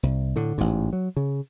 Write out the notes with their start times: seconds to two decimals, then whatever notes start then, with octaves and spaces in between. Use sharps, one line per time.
0.03 C2
0.36 A2 D3
0.58 A1 G#2
0.93 F#3
1.17 C#3